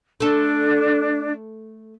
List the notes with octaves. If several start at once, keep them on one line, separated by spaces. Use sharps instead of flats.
A3 D4 A4